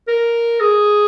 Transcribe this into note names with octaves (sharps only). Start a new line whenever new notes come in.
A#4
G#4